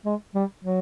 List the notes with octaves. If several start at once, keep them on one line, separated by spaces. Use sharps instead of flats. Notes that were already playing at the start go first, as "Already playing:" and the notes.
G#3
G3
F#3